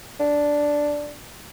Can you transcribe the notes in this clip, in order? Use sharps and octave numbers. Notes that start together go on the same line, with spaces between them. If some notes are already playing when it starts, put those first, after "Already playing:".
D4